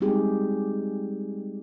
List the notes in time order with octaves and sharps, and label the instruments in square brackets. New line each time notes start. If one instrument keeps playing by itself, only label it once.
[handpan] G3 G#3 C4 D#4 G4 G#4